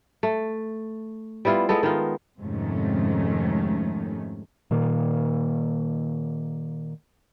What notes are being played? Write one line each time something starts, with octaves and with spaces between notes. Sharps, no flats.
A3
G3 B3 E4 F4
G#3 B3 A4
D#3 B3 F4
F2 G#2 C3 D#3 A3 C#4
A#2 D#3 A#3